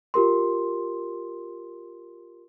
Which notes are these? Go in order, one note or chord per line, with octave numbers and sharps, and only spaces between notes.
F4 G4 A#4 C6